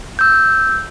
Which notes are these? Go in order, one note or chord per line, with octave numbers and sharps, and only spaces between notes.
E6 G6